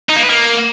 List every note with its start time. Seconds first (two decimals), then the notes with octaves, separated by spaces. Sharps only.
0.09 D#4
0.16 A#3
0.23 B4
0.29 A#3